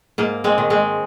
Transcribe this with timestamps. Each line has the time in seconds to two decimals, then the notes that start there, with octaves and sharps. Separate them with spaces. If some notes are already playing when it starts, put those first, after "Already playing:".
0.18 G#2 A#3
0.44 G#3 C4
0.58 D#3
0.70 G#3 C4